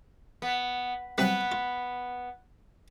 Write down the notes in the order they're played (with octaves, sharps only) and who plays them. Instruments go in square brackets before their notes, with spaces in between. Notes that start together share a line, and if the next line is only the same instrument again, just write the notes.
[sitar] B3
[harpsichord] C3 F#3 G3 [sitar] B3 B4
[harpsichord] F4